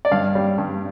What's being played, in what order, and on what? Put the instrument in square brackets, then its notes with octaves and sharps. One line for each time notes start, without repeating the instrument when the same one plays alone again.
[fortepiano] D5
G2 F5
G3
G2